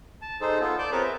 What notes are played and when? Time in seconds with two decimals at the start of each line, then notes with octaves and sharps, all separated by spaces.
0.22 A5
0.41 D#4 G#4 A4 C5
0.60 B3 F4 A4
0.78 D5 A5 D6 G6
0.92 C4 F4 G#4 A#4 B4 C#5
1.04 E5